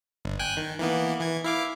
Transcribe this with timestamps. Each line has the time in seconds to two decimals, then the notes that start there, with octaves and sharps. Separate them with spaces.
0.25 G1
0.39 G5 G#5 F#6
0.57 D#3
0.79 E3 A#3 B3
1.20 E3 G#6
1.44 E4 F5 D6